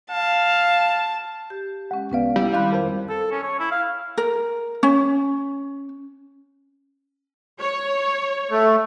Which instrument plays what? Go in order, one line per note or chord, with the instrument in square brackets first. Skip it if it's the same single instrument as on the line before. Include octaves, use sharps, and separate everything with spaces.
[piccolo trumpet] F5 [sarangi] A5
[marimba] G4
[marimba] G#3 C#4 [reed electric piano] F#5
[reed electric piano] C2 B3 F5 [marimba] C#4 B4 D5
[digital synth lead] G3 [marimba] E4
[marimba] D#3 C4 F#6 [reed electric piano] F5 B5
[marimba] F2 F5 [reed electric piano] A#4 C5
[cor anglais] A4
C#4
C#5
E4
F5
[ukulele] A#4
C#4
[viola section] C#5
[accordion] A3